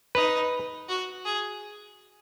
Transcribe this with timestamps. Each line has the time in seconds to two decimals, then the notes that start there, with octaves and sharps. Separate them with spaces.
0.15 D#4 B4
0.89 F#4
1.25 G#4